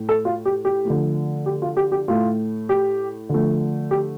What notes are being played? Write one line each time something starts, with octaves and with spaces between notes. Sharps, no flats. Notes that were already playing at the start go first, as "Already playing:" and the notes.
Already playing: A2 A3
A4
F4
G4
G4
D3 F3 A3
G4
F4
G4
G4
A2 A3 F4
G4
D3 F3 A3
G4